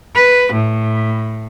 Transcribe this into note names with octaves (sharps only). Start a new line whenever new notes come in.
B4
A2